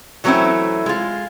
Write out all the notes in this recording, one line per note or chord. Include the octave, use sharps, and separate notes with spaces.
E3 F#3 A3 C4 C#4 E4
G#3 F4